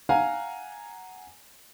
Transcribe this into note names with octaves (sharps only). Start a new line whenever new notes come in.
F5 F#5 G#5 A#5